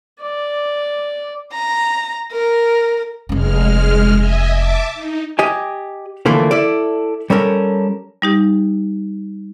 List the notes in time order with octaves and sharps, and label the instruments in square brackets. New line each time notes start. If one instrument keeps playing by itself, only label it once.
[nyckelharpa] D5
[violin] A#5
A#4
[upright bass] F1 C#4 [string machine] G#3 F6
[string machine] D#5 E5 G#5
E5 A5 D6
D#4
[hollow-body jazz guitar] G4 D#5 G#5
D3 E3 F3 A3 A#3 E4
E4 A4 D5
G3 C#4 A4 A#4
[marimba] G3 D#4 G4